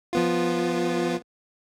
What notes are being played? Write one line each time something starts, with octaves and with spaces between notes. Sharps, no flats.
F3 B3 F4